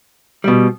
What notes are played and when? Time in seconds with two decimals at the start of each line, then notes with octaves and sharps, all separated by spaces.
0.44 B2 G3